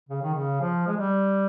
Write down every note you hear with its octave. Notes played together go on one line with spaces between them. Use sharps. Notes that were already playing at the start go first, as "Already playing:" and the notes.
C#3
D#3
C#3
F3
G#3
G3